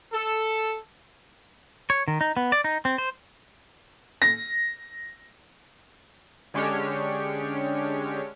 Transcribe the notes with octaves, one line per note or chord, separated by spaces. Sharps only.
A4
C#5
D#3
D#4
B3
D5
D#4
C4
C5
A#6
D3 G#3 C#4 D4 G4 C#5